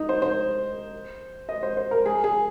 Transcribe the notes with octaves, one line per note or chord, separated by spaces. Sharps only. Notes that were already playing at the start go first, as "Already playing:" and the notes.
Already playing: D#4
C5
C5
D#5
C5
C5
A#4
G#4
G#4